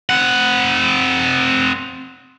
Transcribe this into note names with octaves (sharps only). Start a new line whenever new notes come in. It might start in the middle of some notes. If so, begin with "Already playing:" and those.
C4 F#5